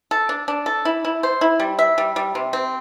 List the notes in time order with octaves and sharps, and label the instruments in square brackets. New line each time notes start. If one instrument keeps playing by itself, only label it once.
[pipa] A4
D4
D4
A4
E4
E4
C5
E4
G3
E5
G3
G3
C3
C4